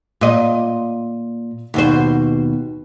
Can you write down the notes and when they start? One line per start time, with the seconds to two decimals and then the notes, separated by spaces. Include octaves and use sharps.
0.21 A#2 D#5
1.74 D#2 B2 C5